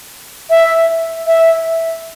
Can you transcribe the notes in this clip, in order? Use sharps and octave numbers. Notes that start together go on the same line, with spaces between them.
E5
E5